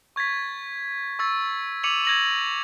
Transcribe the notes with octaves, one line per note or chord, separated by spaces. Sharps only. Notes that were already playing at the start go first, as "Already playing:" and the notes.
C#6 G#6 A6 B6
C#6 E6 A6
D6 C#7 D#7 F7 F#7
G#6 A#6 F#7